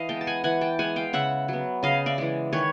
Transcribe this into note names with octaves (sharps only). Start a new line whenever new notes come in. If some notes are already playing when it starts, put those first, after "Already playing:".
Already playing: E3 D#5 F5
G#3 B3 G5 A5
A5
F#5 G#5
E3 F#5 G#5
G5 A5
G#3 B3 F#5 G#5
F5 G5
C#3 E5 F#5
F#3 B3
C#3 D#5 F5
D5 E5
E3 G#3
D#3 B4 C#5